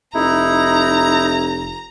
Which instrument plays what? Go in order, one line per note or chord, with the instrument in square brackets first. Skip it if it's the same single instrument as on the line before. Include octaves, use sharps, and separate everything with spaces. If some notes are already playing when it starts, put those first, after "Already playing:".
[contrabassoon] F1 [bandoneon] D#4 E4 [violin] A#5